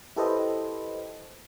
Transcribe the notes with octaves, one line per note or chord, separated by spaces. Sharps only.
E4 G4 A4 B4 C5 D#5